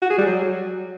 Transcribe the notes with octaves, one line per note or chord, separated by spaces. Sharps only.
F#4
G#4
G3
F#3